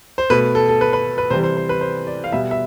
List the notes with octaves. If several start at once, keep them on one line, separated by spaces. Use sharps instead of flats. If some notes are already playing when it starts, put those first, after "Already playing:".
C5
B2 A3 B4
A4
A4
B4
B4
B4
C3 E3 G3 C5
C5
C5
B4
C5
D5
F5
B2 G3 B3 E5
E5